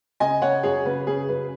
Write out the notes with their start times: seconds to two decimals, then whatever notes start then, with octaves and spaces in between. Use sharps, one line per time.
0.20 C#3 D#5 G#5
0.42 C#3 C#5 F#5
0.63 F#2 G#4 C#5
0.85 C#3 B4
1.07 C#3 G#4
1.29 F#2 B4